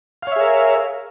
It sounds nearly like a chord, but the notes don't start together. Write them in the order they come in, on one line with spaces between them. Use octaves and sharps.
F5 C#5 E5 G#4 A#4